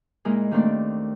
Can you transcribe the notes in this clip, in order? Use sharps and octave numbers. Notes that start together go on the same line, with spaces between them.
A#2 G#3 A#3 D#4 E4 G#4
D#2 A3 A#3 C4 D4 D5